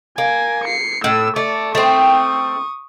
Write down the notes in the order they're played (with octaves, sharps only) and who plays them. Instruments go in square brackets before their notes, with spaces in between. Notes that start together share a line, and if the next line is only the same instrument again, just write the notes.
[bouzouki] A#3 [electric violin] G#5
[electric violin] C7 C#7
[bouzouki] A2 [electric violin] A3 E6
[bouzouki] A3 [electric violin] D5
[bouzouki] A3 C4 [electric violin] C#6 D#6